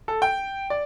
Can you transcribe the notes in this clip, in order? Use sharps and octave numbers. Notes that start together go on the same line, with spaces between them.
A4
G5
D5